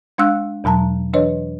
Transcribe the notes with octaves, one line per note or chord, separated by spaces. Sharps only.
G#3 D4 F5 E6 F#6
E2 B2 F#3 A5 A#5
E3 D4 B4 C#5 D#5